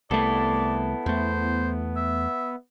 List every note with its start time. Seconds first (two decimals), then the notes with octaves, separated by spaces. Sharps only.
0.11 C2 A3 B3 E4 A4 D5
1.06 E2 A3 C5
1.96 E5